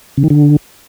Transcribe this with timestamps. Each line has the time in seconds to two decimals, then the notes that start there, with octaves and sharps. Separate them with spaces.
0.17 C#3
0.24 D#3
0.30 D3